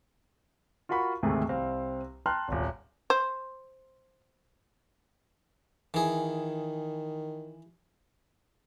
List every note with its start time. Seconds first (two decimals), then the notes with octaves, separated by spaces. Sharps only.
0.89 F4 F#4 A#4 F#5 B5 C#6
1.23 D2 G#2 C3 D#3 A3 G#4
1.49 C2 C4 F5
2.26 G5 A5 A#5 C6 F6 F#6
2.48 D#1 G#1
3.10 C5
5.94 D#3 E3 G#4